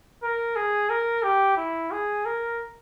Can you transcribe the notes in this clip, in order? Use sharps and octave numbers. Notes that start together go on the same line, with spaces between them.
A#4
G#4
A#4
G4
E4
G#4
A#4